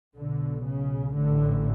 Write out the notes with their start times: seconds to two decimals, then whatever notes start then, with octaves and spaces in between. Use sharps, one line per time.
0.16 B1 B2 D3
0.66 C#3
1.15 A1 A2 D3